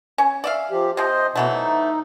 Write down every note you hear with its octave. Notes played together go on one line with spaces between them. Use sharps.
C#4
D5 E5 F5
F3 G4
C3 F3 C5 D#5
B2 E3 F#3 A3
D#4